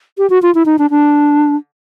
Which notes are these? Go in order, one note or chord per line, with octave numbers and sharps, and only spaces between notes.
G4
F#4
F4
E4
D#4
D4
D4